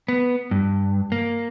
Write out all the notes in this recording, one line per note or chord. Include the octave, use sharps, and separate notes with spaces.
B3
G2
A#3